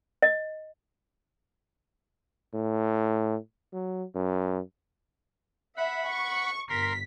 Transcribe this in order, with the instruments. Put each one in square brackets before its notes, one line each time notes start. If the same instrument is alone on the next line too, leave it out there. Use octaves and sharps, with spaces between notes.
[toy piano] D#5
[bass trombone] A2
F#3
F#2
[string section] E5 [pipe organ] F#5 B5
[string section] C#6
[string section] G1 B6 [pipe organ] A#4 C6